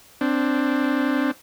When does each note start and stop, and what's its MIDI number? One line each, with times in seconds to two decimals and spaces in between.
0.21 1.31 60
0.21 1.31 62